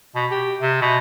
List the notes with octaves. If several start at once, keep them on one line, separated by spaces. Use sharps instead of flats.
B2
G4
C3
B2